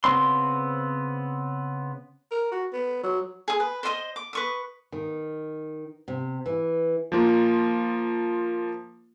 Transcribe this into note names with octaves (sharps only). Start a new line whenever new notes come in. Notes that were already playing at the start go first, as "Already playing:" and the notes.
C#3 B3 C4 C6
A#4
F#4
B3
F#3
G#4 D#6
B4
C5 D5 D#5 D#6
D6
B4 C#6 D#6
D#3
C3
E3
F3 A#3 F4